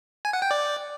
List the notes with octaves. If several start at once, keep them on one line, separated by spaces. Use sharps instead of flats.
G#5
F#5
G5
D5